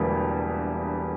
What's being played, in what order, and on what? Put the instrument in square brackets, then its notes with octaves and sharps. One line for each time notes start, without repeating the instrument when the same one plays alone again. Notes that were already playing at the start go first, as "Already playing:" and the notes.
Already playing: [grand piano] E1 E2 D3 G3 A#3